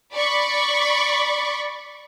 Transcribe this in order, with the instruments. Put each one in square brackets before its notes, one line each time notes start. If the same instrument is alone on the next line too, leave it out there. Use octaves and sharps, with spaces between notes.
[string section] D5 B5 C#6